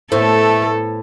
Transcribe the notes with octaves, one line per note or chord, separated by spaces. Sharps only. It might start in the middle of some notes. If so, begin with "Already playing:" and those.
A2 A3 B3 A4 C5